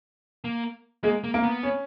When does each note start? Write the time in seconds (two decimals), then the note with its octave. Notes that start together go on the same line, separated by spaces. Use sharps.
0.44 A#3
1.03 G#3 A#3
1.24 A#3
1.34 A#3
1.43 B3
1.63 C#4